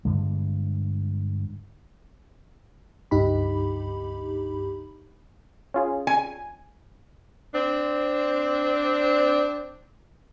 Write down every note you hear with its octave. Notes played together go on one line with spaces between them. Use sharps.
G2 D3 G#3
C#2 G2 D#4 G4 B5
C#4 F4 G#4
G#5
C4 D4